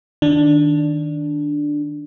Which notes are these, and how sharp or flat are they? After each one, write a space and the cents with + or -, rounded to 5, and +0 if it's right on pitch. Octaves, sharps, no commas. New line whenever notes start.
D#3 +0 D4 +0